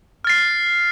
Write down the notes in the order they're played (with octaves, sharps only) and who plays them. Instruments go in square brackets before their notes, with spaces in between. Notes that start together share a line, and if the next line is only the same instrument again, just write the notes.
[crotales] F6 A6 C7